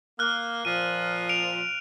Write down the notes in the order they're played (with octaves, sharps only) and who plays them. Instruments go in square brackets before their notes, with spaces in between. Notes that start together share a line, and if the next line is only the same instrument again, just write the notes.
[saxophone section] A#3 [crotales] F6 F#6
[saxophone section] A#2 F3 [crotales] D#7
[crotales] D7 F7